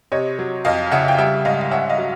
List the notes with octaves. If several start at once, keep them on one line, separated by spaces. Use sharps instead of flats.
C3 C#5 D#5
F#3
F2 D#5 F5
C#3 E5 F#5
G5
G3 E5 F#5
G#2 D#5 F5
F5
C#4 E5 F#5
D#5 F5
F#3